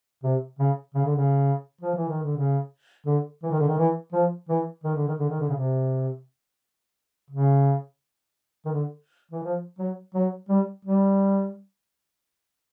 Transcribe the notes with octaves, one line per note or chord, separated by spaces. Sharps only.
C3
C#3
C#3
D3
C#3
F3
E3
D#3
D3
C#3
D3
E3
D#3
D3
D#3
E3
F3
E3
D#3
D3
D#3
D3
D#3
D3
C#3
C3
C#3
D#3
D3
E3
F3
F#3
F#3
G3
G3